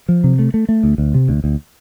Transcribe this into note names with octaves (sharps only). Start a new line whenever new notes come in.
F3
C3
A3
A3
A3
D2
D2
C3
D2
D2